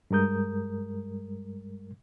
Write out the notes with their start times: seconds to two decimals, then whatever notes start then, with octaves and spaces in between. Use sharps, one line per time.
0.11 G2 G3 G#3 A#4 D#6 G6